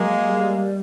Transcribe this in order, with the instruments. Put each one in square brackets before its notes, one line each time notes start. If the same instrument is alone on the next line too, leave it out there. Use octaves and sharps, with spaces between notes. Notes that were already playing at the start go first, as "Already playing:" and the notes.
Already playing: [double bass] F#3 [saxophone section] G#3 A#3
[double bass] G3